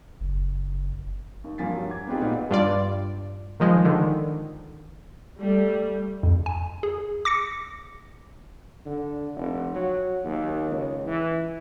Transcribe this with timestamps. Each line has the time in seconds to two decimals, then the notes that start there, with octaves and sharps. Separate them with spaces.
0.20 F#1
1.44 D#2
1.58 G2 F3 A#3 G#5 A6 B6
1.72 F#3 G3
1.90 D6 G#6
2.07 B3 C4 D#4 F4 G4 G#4
2.20 A#2 B3 D#4 F#4 G#4
2.51 G2 F4 D5
3.60 D#3 F3 G#3
3.85 D3 D#3
5.41 G3 A3
6.23 F2
6.46 G#5
6.83 G#4
7.25 D6 A#6 C#7
8.86 D3
9.35 F1
9.75 F#3
10.24 D#2
10.71 C#2
11.06 E3